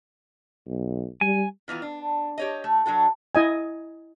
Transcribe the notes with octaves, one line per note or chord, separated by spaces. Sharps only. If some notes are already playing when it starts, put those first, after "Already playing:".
B1
G3 G#5
D#3 E3 B3 F4
D4
G4 C#5 D#5
A3
F#3 D4 F#4 A4
E4 D#5 G#5